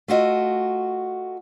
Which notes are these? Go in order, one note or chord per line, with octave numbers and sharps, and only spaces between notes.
A3 F4 F#4 D#5